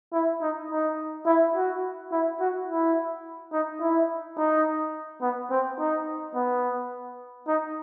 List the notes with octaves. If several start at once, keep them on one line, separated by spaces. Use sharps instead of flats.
E4
D#4
D#4
E4
F#4
E4
F#4
E4
D#4
E4
D#4
B3
C4
D#4
B3
D#4